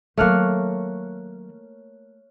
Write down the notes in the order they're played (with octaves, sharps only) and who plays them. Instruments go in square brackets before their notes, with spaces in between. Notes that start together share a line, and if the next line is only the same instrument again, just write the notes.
[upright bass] D#3 F#3 [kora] A3 A#3 [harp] C#5 F6 F#6